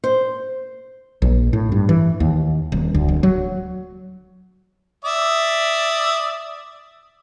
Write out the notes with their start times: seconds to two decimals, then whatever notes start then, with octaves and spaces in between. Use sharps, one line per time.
0.04 C5
1.22 A#1
1.53 A2
1.72 G2
1.89 E3
2.20 D#2
2.72 D#1
2.94 D2
3.08 D1
3.23 F#3
5.05 D5 E5 D#6